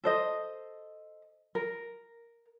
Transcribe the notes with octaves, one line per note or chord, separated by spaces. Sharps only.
A4 C5 D#5
A#4